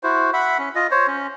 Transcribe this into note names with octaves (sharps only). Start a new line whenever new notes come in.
E4 F#4 C5
E5 F#5 B5
C#4
F4 D#5
C5 C#5
C#4